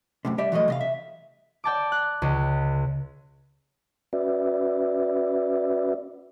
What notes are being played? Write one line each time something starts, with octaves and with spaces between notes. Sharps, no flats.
F#2 A2 C3
G3 G4 D5 E5
E3 F#3 G3 A3 D#5
C3 D#5 F5
E5
D5 G5 A5 D6
F#6
C#2
C#4 F#4 B4 D5 E5